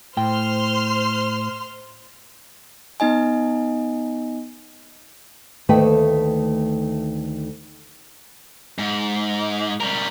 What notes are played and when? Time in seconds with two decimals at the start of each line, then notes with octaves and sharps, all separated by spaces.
0.17 A2 C5 G5 C6 F6
3.00 B3 D#4 D#5 G#5
5.69 D2 D#3 A3 A#3 B4 G5
8.79 G#2
9.80 G3 A#4